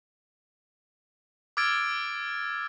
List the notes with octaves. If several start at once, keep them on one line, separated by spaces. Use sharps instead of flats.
D6 E6 F6 G#6 A6 D7